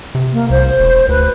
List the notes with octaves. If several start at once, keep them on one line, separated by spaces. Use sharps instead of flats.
C3
A#3
C2 C5
E1
D2 B4